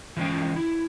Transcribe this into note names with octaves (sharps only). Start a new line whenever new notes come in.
E3 F3 G#3 B3 C#4 G5
E4